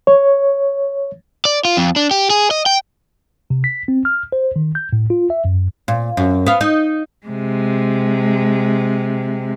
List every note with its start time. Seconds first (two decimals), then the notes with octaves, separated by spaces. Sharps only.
0.07 C#5
1.45 D5
1.65 F4
1.77 F2
1.96 D4
2.11 G4
2.30 G#4
2.51 D#5
2.66 G5
3.50 C3
3.64 B6
3.88 C4
4.05 F6
4.32 C5
4.56 D#3
4.75 G6
4.93 A2
5.10 F4
5.30 E5
5.45 F#2
5.88 A#2
6.17 F#2
6.46 B3 F5
6.61 D#4
7.27 C3 G#3